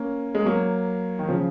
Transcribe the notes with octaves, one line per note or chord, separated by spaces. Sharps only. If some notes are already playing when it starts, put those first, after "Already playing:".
Already playing: A#3 C#4
G#3
F#3 A#3
D#3
C#3 F3